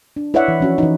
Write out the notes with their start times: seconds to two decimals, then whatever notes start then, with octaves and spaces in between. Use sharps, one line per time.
0.16 D4
0.34 E4 B4 C#5 D5 E5 F#5
0.48 E3
0.60 F3 C#4 F#4
0.78 E3 D#4